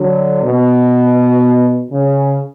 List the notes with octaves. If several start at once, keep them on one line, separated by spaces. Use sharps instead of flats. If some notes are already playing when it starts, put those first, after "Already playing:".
Already playing: D3 F#3
B2
C#3